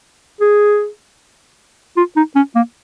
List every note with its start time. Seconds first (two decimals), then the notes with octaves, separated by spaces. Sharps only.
0.41 G#4
1.97 F4
2.16 D#4
2.35 C#4
2.55 A#3